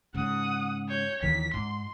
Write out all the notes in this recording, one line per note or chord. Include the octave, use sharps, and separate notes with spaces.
G#2 C#3 F#5 D#6
C#5 G6
D#2 D#3 E3 B6
G#2 C6